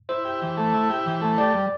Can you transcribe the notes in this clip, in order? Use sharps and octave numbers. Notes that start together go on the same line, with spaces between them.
E4 C5
G4
E3
A3
E4
G4
E3
A3
G4 D5
G3